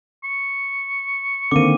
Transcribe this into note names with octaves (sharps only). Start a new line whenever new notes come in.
C#6
D3 D#3 A#3 C4 D6 D#7